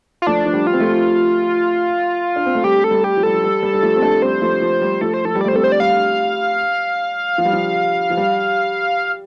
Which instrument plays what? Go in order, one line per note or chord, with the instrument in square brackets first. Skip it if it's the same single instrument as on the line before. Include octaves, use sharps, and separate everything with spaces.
[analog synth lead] F4
[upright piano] F3 A3 [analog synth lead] D4
[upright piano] F3
G3
[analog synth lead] F4
[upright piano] C4
F3 A3
D4
C4
A3
[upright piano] G3 [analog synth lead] G4
[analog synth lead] A4
[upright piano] G3
[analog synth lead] G4
[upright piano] F3
[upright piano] G3 [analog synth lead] A4
[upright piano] F3
G3
G3
G3
F3 A3
C4
A3 D4
[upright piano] G3 C4 [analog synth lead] C5
[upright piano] F3 A3
F3
G3
[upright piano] F3 A3 [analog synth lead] A4
[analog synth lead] C5
[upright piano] F3 [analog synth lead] A4
[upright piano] G3
[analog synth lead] D5
[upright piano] A3 [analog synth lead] C5
[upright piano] G3 C4 [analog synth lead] A4
[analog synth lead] C5
D5
[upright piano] G3 [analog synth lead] F5
[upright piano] F3
G3
F3
F3
G3